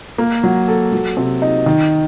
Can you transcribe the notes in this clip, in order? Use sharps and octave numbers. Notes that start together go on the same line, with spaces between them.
A#3
F#3
A4
F#3
C3
D#4
D#3